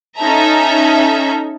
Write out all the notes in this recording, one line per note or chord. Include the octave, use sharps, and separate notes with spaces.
C#4 D#4 A4 E5 A#5